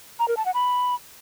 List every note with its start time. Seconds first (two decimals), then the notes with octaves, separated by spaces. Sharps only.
0.19 A#5
0.28 A#4
0.37 A5
0.46 F#5
0.54 B5